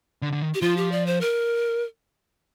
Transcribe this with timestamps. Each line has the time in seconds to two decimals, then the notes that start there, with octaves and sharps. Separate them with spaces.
0.22 D3
0.33 D3
0.42 D#3
0.54 G4
0.61 F3 F4
0.77 G4
0.92 D5
1.06 C5
1.21 A#4